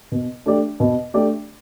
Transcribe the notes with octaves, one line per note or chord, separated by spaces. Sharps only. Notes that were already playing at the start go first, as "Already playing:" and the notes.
B2
A3 D4 G4 D5
B2
A3 D4 G4 D5